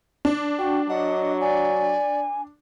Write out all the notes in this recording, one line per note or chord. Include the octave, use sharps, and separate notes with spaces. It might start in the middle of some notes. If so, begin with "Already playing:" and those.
D4
F#4 G5
F#3 D#5 F#5
D5 G#5